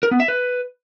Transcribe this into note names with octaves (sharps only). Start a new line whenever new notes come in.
A#4
B3
E5
B4